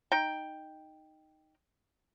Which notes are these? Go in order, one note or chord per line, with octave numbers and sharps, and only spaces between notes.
D#4 G5